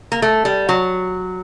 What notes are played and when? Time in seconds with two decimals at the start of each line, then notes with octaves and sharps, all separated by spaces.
0.12 A#3
0.22 A3
0.45 G3
0.69 F#3